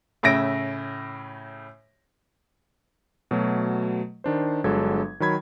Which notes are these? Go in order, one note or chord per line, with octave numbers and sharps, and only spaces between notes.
A2 C#3 E5 A#6 D7
B2 F#3 A3
D#3 D4 C5
G1 F#3 G#3 D4 A4 G#6
D#3 F#3 B5 G#6